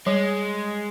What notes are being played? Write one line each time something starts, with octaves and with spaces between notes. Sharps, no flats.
G3 G#3